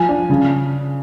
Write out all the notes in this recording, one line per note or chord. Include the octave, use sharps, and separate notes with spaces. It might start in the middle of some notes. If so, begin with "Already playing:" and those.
Already playing: F3 G#5
D4
C#3